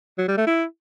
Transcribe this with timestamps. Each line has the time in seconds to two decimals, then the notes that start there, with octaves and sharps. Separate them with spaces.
0.18 F#3
0.28 G3
0.37 A3
0.47 E4